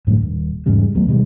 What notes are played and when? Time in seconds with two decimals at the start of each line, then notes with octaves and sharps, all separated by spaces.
0.07 F#2 A2 D3 F3
0.21 D#1
0.66 E2 G#2 C#3 G3
0.95 D#2 F#3 A3 B3
1.08 B2 D#3 G3 G#3